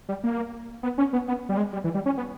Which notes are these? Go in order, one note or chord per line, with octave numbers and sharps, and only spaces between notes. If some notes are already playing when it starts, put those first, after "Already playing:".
G3
A#3
B3
C#4
B3
B3
G3
G#3
G3
E3
G3
C#4
B3